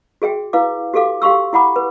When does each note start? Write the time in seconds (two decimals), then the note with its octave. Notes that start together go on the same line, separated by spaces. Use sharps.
0.22 F#4 G#4 E5 G5
0.53 E4 B4 F5 D6
0.94 F#4 G4 A4 F5 D6
1.22 G4 F5 C6 C#6 E6
1.53 E4 F#5 B5 D6
1.76 B4